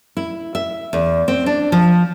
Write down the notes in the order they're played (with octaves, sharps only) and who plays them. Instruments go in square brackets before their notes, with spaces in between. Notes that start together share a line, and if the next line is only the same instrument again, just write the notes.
[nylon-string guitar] E4
E5
E2
C4
D4
F3